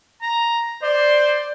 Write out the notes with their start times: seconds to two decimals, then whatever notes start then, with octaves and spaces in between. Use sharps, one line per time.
0.22 A#5
0.83 C5 D5